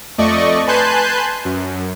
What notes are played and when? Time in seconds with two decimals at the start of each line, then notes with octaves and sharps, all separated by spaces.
0.18 F2 A3 D5 D#5 C#6
0.67 B4 G#5 A5 C6 F#6 G6
1.45 F#2